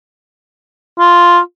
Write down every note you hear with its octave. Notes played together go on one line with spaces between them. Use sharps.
F4